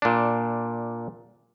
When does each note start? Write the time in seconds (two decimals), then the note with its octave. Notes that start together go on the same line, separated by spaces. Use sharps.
0.02 A#2 D4